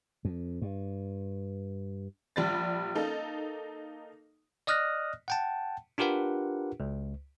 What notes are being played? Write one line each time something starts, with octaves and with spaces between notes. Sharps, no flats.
F2
G2
A#1 G3 A6
A#3 D#4 A4
D5 D#5 D#6 F6 F#6 A#6
F#5 G5 A5
D4 F4 G4 A#4 B4 F#5
C#2